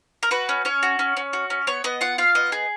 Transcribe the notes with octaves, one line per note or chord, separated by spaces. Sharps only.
A#4
F#4 B4
C#4
C#4 C#5
F#4
C#4
C#4
F#4
C#4
B3 C#5
B3 D#5
F4 F#5
F4 F5
B3 D#5
G#4